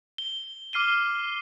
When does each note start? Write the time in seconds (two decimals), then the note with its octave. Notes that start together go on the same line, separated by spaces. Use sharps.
0.18 G7
0.73 D6 F6 C7 D#7 G7